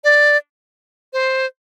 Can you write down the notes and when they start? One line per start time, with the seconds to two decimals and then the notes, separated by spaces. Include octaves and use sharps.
0.04 D5
1.13 C5